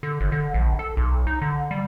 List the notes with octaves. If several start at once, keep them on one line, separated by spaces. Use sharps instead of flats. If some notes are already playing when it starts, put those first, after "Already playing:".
D3
G1
D3
A#1
A4
B1
D#4
D3
G3